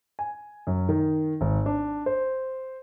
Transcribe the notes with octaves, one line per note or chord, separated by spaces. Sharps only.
G#5
F#2
D#3
G#1
D4
C5